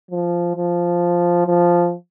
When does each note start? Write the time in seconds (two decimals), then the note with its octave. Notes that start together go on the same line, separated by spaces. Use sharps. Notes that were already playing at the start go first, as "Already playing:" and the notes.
0.11 F3
0.56 F3
1.46 F3